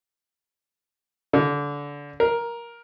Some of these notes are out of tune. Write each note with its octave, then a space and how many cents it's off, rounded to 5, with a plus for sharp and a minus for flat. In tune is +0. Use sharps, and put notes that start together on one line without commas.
D3 -25
A#4 +10